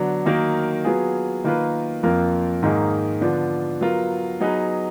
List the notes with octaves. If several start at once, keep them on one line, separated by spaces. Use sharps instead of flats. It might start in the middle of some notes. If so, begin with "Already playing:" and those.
Already playing: D3 F#3 B3 D4
D#3 F#3 A#3 D#4 A#4
F#3 B3 F4 G#4
D#3 A#3 F4 B4
F2 F3 A#3 F4 A#4
G#2 D#3 A#3 D#4 G#4
D3 F3 B3 D4
F#3 B3 F4 A#4
F#3 B3 D#4 G#4 B4